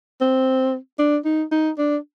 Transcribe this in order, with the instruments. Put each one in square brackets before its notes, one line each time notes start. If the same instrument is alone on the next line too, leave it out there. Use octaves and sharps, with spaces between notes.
[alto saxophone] C4
D4
D#4
D#4
D4